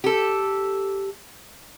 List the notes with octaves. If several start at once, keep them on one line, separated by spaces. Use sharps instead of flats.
G4 A4